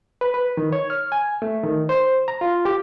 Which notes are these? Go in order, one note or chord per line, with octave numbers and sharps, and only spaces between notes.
B4
B4
D#3
C#5
F6
G#5
A3
D#3
C5
A#5
F4
G4